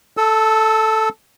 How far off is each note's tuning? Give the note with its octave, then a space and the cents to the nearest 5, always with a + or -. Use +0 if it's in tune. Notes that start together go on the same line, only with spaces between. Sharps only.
A4 +0 E6 -25